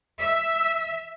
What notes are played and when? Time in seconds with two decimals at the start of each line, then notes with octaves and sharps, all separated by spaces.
0.20 E5